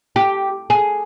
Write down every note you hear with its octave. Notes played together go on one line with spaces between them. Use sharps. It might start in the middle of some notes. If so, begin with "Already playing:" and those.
G4
G#4